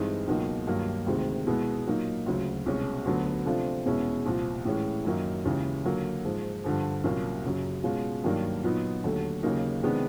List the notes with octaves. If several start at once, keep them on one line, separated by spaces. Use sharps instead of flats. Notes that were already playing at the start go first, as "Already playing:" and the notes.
Already playing: G2 E3 G#3 C4 D#4
C#2 B2 F#3 A#3 D#4
G2 D#3 F#3 A#3 D#4
D2 C3 D#3 G#3
B2 G#3 B3 E4
A#2 F#3 A#3 D#4
D2 C#3 F#3
C2 B2 G#3 C#4
D2 D3 F#3 B3
C3 F3 A3 D4 F4
E2 B2 G#3 C#4 E4
C2 A#2 F3
A2 E3 G#3 C#4 E4
F#2 D#3 F#3 A#3 D#4
D#2 C#3 E3 G#3
D3 F#3 A#3
G#2 F3 G#3
G2 D3 F3
C2 A#2 F#3 A#3 C#4
F#2 C#3 F#3
B2 G#3 C#4 F4
G2 D#3 F#3 A#3 D4
A#2 F#3 B3 D#4
D#2 D3 F#3 A3
D#2 C#3 F#3 A#3 D#4
C3 D#3 G#3 B3 D4